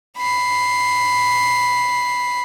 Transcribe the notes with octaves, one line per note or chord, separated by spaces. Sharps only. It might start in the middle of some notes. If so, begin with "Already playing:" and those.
B5 C7